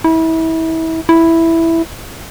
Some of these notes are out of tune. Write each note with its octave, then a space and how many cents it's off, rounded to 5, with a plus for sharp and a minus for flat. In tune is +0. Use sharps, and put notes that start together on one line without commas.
E4 -30
E4 +0